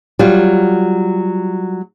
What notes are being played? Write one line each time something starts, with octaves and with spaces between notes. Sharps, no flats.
F#3 G3 F4